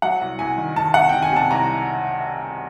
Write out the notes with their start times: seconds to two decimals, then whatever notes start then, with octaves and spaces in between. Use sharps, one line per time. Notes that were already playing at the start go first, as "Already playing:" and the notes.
0.02 F#3 F#5
0.21 C2
0.39 C2 G#5
0.58 D#3
0.76 D#3 A5
0.94 C3 F#5
1.09 D#3 G5
1.22 G#5
1.32 C3 A5
1.51 C2 A#5